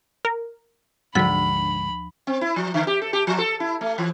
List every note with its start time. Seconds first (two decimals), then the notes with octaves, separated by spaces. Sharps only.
0.25 A#4
1.15 D2 G#2 D3 F3 F#3 B5 E6 B6
2.27 C4
2.41 E4
2.56 F3
2.74 D3
2.87 G4
3.02 A4
3.13 G4
3.27 F3
3.39 A4
3.60 E4
3.81 A3
3.98 E3